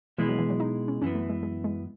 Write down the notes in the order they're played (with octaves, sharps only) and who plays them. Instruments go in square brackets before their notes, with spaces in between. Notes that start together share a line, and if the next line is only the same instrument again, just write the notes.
[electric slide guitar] B2 G#3 B3 E4 G#4 [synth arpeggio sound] E3
[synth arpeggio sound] F#3
E3
F#3
D#4
C#4
[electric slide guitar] F#2 E3 B3 [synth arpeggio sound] C#4
[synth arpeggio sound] A3
G#3
G#3
G#3